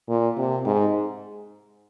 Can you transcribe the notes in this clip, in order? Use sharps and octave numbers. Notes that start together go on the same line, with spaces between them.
A#2
C3
G#2